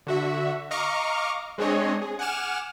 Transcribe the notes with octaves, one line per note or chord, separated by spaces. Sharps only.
D3 F#4 E5
D#5 F5 A#5 C#6 D6 F6
G#3 C4 D4 G#4 C#5 D#5
G#4
F#5 G#5 D6 F6 E7